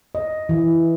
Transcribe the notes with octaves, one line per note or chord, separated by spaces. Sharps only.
D#5
E3